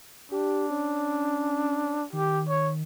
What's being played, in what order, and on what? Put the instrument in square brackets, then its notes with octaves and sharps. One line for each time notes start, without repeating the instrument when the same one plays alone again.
[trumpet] D4 [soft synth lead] G4
[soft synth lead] C#4
[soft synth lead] D#3 [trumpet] G4
[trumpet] C#5